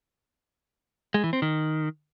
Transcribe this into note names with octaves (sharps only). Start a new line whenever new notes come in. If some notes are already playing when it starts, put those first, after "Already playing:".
G#3
E3
C4
D#3